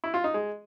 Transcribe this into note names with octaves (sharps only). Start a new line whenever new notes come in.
E4
F4
D#4
G#3